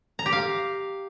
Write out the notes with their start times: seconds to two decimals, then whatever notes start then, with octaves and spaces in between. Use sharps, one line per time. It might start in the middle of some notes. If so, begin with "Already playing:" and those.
0.19 A#5
0.26 G4
0.32 F5